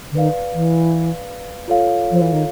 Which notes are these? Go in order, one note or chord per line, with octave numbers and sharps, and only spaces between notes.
D3
D#3 B4 D5 F5
E3
F4 A4 C#5 F5
F3
E3
D#3